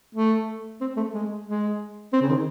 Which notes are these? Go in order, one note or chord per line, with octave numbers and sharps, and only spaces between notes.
A3
C4
A3
G#3
G#3
C4
C#3
D#3